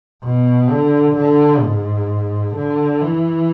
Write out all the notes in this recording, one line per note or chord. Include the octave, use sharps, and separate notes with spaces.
B2
D3
D3
G#2
D3
E3